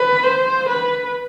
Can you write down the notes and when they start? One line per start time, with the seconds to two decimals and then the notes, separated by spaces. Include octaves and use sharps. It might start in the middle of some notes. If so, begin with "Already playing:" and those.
Already playing: B4
0.24 C5
0.69 B4